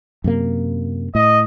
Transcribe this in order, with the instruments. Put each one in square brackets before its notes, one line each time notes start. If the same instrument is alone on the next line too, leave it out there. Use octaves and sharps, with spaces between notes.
[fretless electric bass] F#2 C3 A#3
[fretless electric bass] A2 [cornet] D#5